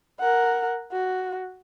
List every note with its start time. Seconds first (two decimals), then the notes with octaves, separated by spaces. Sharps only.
0.19 A#4 F#5
0.92 F#4